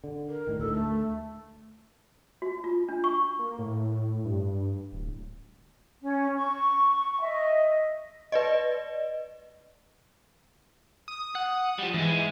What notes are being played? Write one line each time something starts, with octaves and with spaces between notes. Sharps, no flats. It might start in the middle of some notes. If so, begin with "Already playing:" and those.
D3
A#4
A2 D#3
D2 A4
A3
F#4
F4
D4
C#6
A#3
A2
G2
D1
C#4
C#6
D#5 E5
B4 D5 D#5
D#6
F#5
F3 G3
G#2 E3 G#3